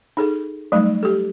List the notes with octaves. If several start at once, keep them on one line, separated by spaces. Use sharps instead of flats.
D#4 G#4 A4
F#3 G3 A3 D#4
G4 A4